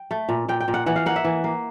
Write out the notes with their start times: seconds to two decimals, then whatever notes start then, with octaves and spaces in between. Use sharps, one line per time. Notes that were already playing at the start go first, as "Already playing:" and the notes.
Already playing: G5
0.11 A3
0.29 A#2
0.48 A#2 G5
0.60 G5
0.68 A#2
0.74 F#5
0.86 E3 F#5
0.96 F5
1.06 A#3 F#5
1.16 E5
1.24 E3
1.44 A#3